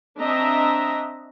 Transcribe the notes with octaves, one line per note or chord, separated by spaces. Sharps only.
C4 D4 D#5 E5 A#5